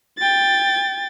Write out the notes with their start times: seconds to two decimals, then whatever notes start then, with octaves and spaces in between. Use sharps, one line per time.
0.19 G5 A6